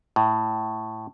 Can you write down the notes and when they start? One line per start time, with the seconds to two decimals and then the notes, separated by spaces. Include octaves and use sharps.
0.16 A2